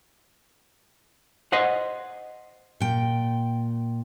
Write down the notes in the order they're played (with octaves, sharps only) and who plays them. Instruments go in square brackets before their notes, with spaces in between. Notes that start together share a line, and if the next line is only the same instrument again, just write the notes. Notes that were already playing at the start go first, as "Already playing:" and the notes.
[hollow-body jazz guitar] C5 D#5 F#5
[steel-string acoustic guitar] A#2 G5